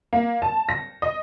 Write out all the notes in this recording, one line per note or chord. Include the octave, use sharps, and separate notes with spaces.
A#3
A5
A#6
D#5